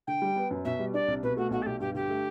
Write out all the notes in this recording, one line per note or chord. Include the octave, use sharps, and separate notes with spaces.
D3 G5
G3
B3
F#2
B2 E5
G3
D4 D5
C2
B2 B4
A3 F#4
B1 F#4
A4
B1 G4
G2 G4
D3 G4
A3